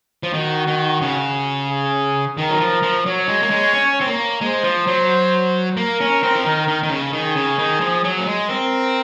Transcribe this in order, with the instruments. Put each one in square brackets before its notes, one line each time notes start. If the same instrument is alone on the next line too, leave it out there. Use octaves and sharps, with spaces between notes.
[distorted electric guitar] F3
[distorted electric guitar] D#3 [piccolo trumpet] F#4
[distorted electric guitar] D#3
C#3
[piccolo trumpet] G#4
[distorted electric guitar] D#3 [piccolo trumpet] A#4
[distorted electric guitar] F#3
F3
F3
[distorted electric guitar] F#3 [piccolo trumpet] C#5
[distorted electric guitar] G#3
A#3
G#3
C#4
C4
A#3
[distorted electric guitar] G#3 [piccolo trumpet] C5
[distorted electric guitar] F3
F#3
[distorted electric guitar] A#3 [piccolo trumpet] A#4
[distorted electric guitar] C#4
C4
F3
D#3
D#3
D#3
C#3
[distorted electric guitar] D#3 [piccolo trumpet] G#4
[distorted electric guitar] C#3
D#3
F3
F#3
A#3
G#3
[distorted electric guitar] C4 [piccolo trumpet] A#4